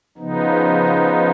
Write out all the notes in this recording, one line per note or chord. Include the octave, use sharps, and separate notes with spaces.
C#3 F3 B3 D#4
B4
D#5